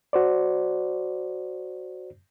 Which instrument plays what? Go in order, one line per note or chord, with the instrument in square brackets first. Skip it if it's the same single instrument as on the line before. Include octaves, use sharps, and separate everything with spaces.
[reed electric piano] F#4 C5 D5